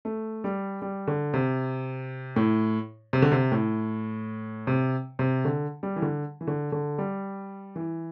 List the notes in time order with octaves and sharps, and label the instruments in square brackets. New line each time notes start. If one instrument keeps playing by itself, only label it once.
[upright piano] A3
G3
G3
D3
C3
A2
C3
D3
C3
A2
C3
C3
D3
G3
E3
D3
E3
D3
D3
G3
E3